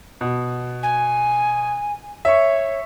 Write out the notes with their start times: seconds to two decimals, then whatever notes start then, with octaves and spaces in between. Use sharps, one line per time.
0.21 B2
0.83 G#5
2.25 C#5 E5 C#6